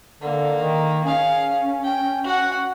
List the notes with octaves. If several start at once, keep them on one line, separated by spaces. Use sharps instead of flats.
D3 A#3
D#3
C#4 G#4 F5
G5
F#4 F#5